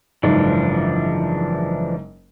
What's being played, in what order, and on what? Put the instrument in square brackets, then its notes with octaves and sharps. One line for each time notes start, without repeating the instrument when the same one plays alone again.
[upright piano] F#1 G#2 [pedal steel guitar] E3 F3 D4